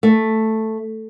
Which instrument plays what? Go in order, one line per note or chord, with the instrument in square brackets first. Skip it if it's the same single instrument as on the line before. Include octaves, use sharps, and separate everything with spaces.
[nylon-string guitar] A3